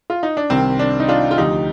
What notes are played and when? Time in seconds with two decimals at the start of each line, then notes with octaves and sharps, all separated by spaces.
0.10 F4
0.23 D#4
0.37 D4
0.50 C2 C3 D#3 C4
0.79 D4
1.00 D#4
1.08 D4 F4
1.31 F4
1.38 D2 C3 F3 D#4 G4